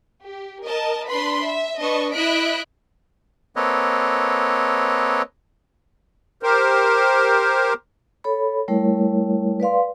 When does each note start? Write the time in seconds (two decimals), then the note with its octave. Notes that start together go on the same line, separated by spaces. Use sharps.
0.24 G4
0.64 A#4 D#5 A5
1.08 D4 B4 B5 C6
1.46 E5
1.81 D4 B4 D#5 A5 C#6
2.13 E4 D#5 E5 F#6 B6 D7
3.56 A#3 C4 A4 B4 C#5 D#5
6.43 G4 A#4 C5
8.24 A4 C#5 B5
8.68 G3 A3 E4 A#4 C#5
9.60 B4 D5 F5 C6